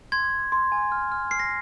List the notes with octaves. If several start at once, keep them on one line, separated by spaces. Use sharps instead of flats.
C6 G#6
C6
C6
G#5
F6
F6
F6 C7
A#6